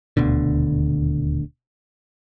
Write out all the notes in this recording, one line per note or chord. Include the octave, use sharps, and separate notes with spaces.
D#1 D2 B2 D3